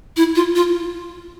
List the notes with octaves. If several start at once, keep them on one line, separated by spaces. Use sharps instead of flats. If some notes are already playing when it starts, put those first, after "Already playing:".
E4
F4
F4